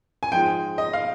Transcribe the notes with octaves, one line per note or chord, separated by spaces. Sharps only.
G#5
G#2 F3 G#3 G5
D#5
F5